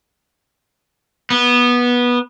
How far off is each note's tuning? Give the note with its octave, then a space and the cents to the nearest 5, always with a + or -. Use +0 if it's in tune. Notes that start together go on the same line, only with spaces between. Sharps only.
B3 -15